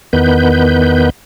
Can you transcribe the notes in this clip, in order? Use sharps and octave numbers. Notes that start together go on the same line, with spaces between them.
E2 D#3 B3 B4 G6